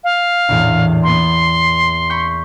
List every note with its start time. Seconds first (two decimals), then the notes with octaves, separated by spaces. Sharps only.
0.04 F5
0.49 A#1 E2 A2
1.03 A#3 B3 C6
2.10 B5 C#6 G6